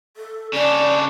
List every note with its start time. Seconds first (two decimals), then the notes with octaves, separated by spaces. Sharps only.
0.17 A4
0.53 C#3 D4 D5